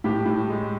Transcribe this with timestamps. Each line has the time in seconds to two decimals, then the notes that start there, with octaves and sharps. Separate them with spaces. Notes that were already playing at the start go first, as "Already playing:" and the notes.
0.04 A2 G4
0.26 A2
0.49 G#3